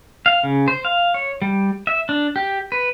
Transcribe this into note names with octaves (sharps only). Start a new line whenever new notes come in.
F5
C#3
C5
F5
C#5
G3
E5
D4
G4
B4